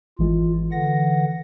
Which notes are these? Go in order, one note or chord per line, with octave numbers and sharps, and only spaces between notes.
G#1 E3 G#3 F4
D3 E3 F#5 A#6